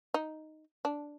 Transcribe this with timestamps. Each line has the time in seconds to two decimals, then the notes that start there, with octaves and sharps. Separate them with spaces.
0.14 D#4
0.85 D4